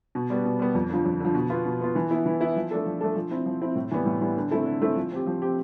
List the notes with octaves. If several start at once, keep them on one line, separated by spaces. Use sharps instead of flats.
B2
G3 B3
B2
G3 B3
F2
D3 F3
F2
D3 F3
B2
B3 F4
B2
B3 F4
E3
B3 E4
E3
B3 E4
F3
A3 D4 A4
F3
A3 D4 A4
F3
C4 E4
F3
C4 E4
A2
E3 G3 B3
A2
E3 G3 B3
D3
A3 C4 E4 A4
D3
A3 C4 E4 A4
F3
C4 G4
F3
C4 G4